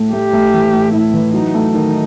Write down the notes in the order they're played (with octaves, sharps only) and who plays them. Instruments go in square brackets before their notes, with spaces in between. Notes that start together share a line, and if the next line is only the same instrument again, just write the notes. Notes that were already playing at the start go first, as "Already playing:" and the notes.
Already playing: [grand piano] A2 A3
[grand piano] A3 [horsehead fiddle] G4
[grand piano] A3
E3
A2
[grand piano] A2 [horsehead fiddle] E4
[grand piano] E3
[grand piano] F#3 [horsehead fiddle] D#4
[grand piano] A3
[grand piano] D#3 [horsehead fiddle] D#4